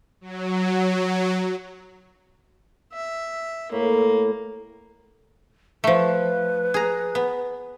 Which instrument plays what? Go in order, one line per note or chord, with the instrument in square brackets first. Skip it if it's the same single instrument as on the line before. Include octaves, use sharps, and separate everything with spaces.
[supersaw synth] F#3
[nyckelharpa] E5
[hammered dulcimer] A2 [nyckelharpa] A#3
[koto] F3 A3 [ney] B4
[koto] G#4 A#5
B3